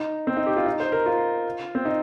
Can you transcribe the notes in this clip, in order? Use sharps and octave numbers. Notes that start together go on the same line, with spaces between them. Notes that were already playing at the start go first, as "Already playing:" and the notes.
Already playing: D#4
C4
D#4
G4
F4
D#4
C5
A#4
F4
C4
D#4